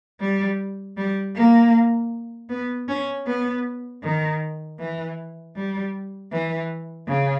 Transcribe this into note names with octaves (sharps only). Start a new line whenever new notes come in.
G3
G3
A#3
B3
C#4
B3
D#3
E3
G3
E3
C#3